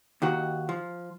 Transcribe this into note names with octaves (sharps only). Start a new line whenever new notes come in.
D#2 D#3 F#4
F3